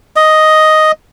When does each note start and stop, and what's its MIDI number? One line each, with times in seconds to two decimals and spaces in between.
0.16 0.92 75